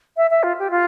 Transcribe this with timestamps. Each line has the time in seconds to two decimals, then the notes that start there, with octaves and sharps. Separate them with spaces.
0.17 E5
0.31 E5
0.43 F4
0.59 G4
0.71 F4